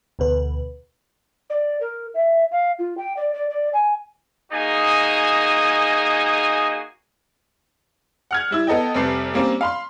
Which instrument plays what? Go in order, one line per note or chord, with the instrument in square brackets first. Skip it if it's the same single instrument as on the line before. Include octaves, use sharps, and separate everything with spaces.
[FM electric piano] D2 B2 B4
[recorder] D5
A#4
E5
F5
F4
G5
D5
D5
D5
G#5
[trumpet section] A#3 D#4 F#4 G#4 D#5 G#5
[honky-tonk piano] F#5 F6 G#6
G3 E4 E6
B3 A4 D#5 G5
F1 C3 G3 A3 B4 C7
G3 A#3 C4 C#4
F5 B5 C6